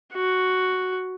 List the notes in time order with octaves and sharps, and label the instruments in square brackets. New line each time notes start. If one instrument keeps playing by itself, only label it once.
[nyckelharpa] F#4